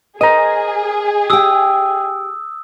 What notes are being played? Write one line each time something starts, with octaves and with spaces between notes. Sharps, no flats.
G#4 A#4 C5 D#5 A#5
G4 G5 D#6 E6